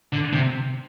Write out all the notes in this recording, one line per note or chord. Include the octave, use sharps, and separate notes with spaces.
D3
C3